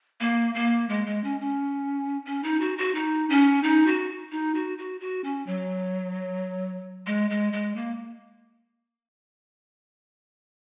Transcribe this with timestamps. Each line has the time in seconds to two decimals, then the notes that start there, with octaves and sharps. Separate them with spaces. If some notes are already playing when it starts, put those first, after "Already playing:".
0.21 A#3
0.55 A#3
0.89 G#3
1.07 G#3
1.24 C#4
1.40 C#4
2.26 C#4
2.43 D#4
2.61 F#4
2.78 F#4
2.95 D#4
3.30 C#4
3.63 D#4
3.87 F#4
4.32 D#4
4.55 F#4
4.78 F#4
5.01 F#4
5.24 C#4
5.47 F#3
7.07 G#3
7.30 G#3
7.53 G#3
7.76 A#3